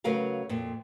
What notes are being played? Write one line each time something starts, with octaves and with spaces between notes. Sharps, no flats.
C#3 F#3 A3 A#4 B4 F5
F2 A#2